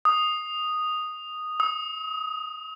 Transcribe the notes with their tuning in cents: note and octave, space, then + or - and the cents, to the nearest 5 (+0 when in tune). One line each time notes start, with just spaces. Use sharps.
D#6 -5
D#6 +35